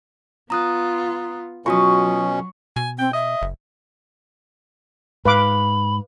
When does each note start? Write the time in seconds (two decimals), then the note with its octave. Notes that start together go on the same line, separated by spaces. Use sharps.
0.50 B3 F4 A#5 D#6 F#6
1.66 B2 F#3 C#4 F4 F#4 C#6 D#6
2.76 B2 G#5
2.99 C4 G5
3.13 D#5 E5
3.42 F#1
5.25 G#2 B4 F5 B5 D6